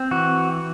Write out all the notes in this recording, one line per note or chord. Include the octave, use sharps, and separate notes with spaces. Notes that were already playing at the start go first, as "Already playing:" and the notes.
Already playing: C4
E3 F#4